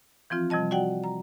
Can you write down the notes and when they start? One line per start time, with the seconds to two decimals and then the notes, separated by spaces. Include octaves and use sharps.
0.30 E3 F3 C4 F4
0.50 C3 F3 G3 D#5 A5
0.71 F#4 D5 F#5 G5
1.04 A#5